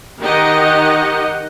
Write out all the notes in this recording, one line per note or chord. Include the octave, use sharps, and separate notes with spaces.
D#3 D#4 G4 D#5 F#5